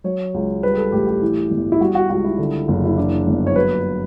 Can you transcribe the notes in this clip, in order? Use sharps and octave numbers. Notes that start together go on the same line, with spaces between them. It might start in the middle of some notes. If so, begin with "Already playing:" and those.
F#3 C#5
C#2
G3 B4
A4
A1 G4
G4
E3
G1
E4
G3 F#4
F#4
C#2 F#4
E4
D3
F#1
E4
E3 D4
G1
C#5
F#3 B4